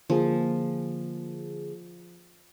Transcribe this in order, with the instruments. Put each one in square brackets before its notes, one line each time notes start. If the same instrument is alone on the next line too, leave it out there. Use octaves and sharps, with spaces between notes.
[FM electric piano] D3 A#3 G#4 [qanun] F3